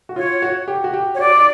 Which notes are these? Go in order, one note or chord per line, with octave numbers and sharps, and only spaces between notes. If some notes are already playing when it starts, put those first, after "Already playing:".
F#4
F4 C#5
F#4
G4
F#4
G4
C#5
F#4 D5
D#4